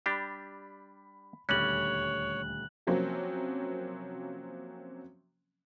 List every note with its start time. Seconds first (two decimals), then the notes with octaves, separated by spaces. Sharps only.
0.06 G3 D4 G4 B5
1.49 D#1 D2 G3 C#4 G4 C#5 F#6 F#7
2.87 C3 F3 F#3 A#3 C4 C#4